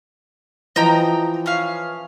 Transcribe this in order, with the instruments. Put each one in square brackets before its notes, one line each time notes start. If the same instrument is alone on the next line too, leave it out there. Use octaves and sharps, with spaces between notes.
[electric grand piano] E3 F3 [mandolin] D#5 G5 A#5
[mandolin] C#4 F5